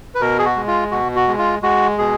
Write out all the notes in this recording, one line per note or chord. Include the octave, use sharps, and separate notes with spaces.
B4
B2 A#4
G#4
F#4
G#3
F4
B2 F#4
F#4
G#3
F4
G#3 F#4
B2 G#4